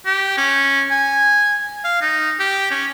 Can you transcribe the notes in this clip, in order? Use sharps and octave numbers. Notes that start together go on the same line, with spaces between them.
G4
C#4
G#5
F5
D#4
G4
C#4